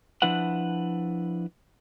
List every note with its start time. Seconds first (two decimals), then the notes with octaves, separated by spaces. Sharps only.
0.22 F3 D4 E4 B4 F#5